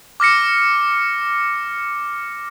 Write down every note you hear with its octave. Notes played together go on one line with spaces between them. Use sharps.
D6 F6 A#6 C#7